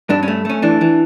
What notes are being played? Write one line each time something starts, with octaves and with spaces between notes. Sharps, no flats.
G2 D4
C#4
A3
A3 C#4
E3 D4
E3